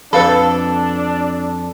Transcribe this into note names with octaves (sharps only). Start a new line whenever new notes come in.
F2 D4 A4 B4 F5 B5